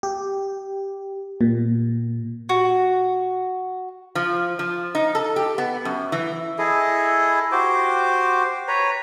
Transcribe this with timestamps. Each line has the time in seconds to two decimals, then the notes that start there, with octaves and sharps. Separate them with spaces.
0.03 G4
1.41 A#2
2.49 F#4
4.15 F3
4.59 F3
4.95 D#4
5.15 A4
5.36 G4
5.58 B3
5.85 F#2
6.12 E3
6.58 E4 G#4 A4 D#5
7.52 F#4 G4 C5 D6
8.68 B4 C#5 A#5